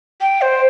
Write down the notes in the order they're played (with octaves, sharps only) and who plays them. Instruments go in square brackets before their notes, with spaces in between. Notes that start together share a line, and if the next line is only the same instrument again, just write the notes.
[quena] G5
C5